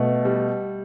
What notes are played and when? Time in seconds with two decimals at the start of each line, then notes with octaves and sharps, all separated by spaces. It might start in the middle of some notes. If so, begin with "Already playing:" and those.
Already playing: B2 A3
0.25 G3